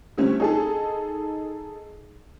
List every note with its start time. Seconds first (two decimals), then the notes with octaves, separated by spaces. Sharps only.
0.18 D3 G3 A3 C4 C#4
0.40 D#4 G#4 A4